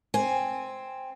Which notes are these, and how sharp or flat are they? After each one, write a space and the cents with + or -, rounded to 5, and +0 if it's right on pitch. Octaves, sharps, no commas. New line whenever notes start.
C4 +0 G#5 +0